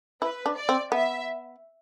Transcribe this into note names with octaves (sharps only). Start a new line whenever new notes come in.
E4 B4
D4
D5
C4
B3 E5